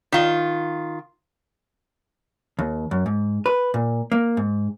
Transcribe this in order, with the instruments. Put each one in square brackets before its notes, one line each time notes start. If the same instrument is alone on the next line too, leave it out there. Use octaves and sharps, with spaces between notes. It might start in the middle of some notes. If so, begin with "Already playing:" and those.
[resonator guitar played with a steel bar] D#3 F4
[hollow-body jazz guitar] D#2
F#2
G#2
B4
A#2
A#3
G#2